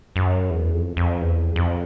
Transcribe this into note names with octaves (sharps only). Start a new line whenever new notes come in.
F#2
E2
F2
F2
E2
F2